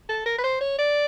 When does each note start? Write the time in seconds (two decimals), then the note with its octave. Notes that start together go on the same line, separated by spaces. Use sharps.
0.09 A4
0.26 A#4
0.38 B4
0.44 C5
0.61 C#5
0.79 D5